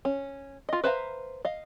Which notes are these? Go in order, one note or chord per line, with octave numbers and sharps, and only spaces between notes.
C#4
F4 D#5
B4 C5 E5 F5 A#5
D#5 F5